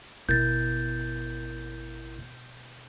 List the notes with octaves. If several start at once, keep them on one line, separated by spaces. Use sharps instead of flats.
G#1 B2 E4 A#4 G6 A6